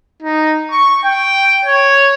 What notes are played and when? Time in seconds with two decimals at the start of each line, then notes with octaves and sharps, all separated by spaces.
0.23 D#4
0.71 C#6
1.05 G5
1.65 C#5